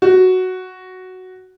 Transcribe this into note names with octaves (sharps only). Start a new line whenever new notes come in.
F#4